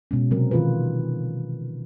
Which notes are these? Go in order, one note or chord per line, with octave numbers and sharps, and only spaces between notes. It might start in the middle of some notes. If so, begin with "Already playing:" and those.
B2 G#3 C#4
C3 F#3 C4 A#4
D#3 E3 F4 G#4 B4